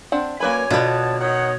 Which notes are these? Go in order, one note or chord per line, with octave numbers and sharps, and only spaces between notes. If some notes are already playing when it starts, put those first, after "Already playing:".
C4 D4 F#5
F#2 A#3 B4 C#5 D5 G#5 B5
B2 D3 B3 D4 F4 A5
D#3 C#5 D#5 F#5